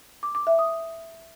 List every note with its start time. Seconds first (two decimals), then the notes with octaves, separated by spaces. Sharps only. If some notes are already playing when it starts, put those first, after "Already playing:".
0.23 D6
0.35 D6
0.47 E5
0.59 D#6